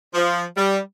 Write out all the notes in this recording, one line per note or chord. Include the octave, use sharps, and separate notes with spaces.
F3
G3